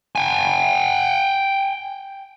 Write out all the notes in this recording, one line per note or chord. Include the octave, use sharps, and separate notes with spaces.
G5 G#5